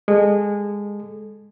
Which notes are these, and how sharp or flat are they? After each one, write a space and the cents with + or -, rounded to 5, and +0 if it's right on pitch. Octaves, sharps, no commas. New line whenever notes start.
G#3 -20 A4 -25